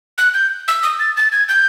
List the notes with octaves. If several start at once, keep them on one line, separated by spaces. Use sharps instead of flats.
F#6
G6
E6
D#6
A6
A6
G#6
G6